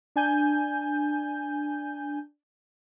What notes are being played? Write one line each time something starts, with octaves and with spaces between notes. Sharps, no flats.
D4 G#5 G6